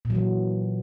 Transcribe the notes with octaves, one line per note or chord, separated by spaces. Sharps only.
A#2
F#3
E3